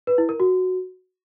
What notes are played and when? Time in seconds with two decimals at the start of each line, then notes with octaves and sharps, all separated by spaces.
0.07 B4
0.18 E4
0.29 A#4
0.40 F#4